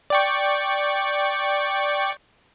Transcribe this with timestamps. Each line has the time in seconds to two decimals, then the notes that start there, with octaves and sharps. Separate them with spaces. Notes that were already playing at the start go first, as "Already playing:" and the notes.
0.10 D5 G5 C#6